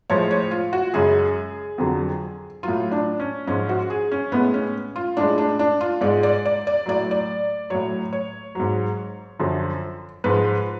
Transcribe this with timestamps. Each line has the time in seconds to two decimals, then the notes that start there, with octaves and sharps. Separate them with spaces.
0.10 A2 F3 G#3 C#5
0.31 C#5
0.51 F4
0.73 F#4
0.94 F#2 C#3 G#3 G#4
1.78 F2 D3 F#3
2.63 A2 F#3 F4
2.92 D4
3.20 C#4
3.47 G#2 F3 G#3 C#4
3.69 F#4
3.90 G#4
4.11 C#4
4.32 A2 G#3 B3
4.54 C#4
4.96 F4
5.17 A2 G#3 D4
5.38 D4
5.59 D4
5.81 F4
6.01 G#2 G#3 D5
6.23 D5
6.45 D5
6.67 D5
6.86 A2 F#3 D5
7.11 D5
7.70 A2 F#3 C#5
8.13 C#5
8.55 G#2 F#3
9.39 F#2 D3 F3
10.24 G#2 F3 G#3 B4